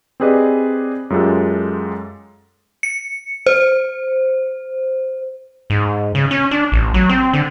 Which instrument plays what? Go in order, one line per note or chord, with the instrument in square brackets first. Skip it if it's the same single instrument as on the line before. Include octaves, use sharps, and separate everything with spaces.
[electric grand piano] C4 G4 G#4 B4 D5 D#5
F#2 G#3 F4 G4 A4
[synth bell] C#7
C5
[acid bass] G#2
C#3
C#4
D4
A1
F#3
C4
D3